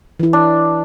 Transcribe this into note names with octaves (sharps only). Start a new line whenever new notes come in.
E3 E4
D4